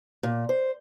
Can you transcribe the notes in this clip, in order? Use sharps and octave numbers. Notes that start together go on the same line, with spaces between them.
A#2
C5